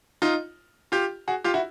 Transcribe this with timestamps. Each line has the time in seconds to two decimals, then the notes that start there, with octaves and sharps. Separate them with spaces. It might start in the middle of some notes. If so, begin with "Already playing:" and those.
0.22 D#4 F4
0.92 F4 G4
1.28 F#4 G#4
1.44 F4 G4
1.54 E4 F#4